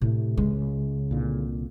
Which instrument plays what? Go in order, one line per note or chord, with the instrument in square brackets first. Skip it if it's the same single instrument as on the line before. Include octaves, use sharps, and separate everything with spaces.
[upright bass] A2 [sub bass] C3
[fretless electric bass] C#2 [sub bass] C#3 [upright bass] G#3
[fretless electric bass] C2 A#2 D3